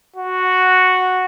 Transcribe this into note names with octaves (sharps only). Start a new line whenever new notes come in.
F#4